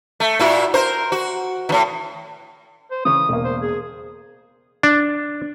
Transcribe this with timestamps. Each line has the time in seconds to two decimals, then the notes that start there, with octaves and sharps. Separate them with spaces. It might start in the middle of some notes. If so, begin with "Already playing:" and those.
0.20 A3
0.39 A#2 E4 F#4
0.74 A#4 C5
1.12 F#4
1.69 A2 D#3
2.91 C5
3.05 C#3 E3 C#4 D#6
3.29 E1 A#3
3.44 C5
3.62 G#4
4.83 D4